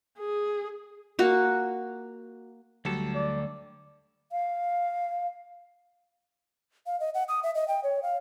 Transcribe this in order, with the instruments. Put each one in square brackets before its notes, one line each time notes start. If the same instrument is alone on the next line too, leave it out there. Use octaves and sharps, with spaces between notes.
[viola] G#4
[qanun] A#3 F#4
[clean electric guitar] D2 A4 [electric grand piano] F#3 G3
[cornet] D5
[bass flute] F5
[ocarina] F5
D#5
F#5
D#6
E5
D#5
G5
C#5
F5